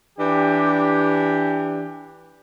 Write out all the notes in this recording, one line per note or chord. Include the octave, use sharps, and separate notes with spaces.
E3 D4 G4